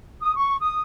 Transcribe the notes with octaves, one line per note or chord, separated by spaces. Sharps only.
D#6
C#6
D#6